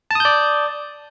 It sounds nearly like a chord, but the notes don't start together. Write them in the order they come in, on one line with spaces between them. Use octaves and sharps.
A5 D#6 G6 D5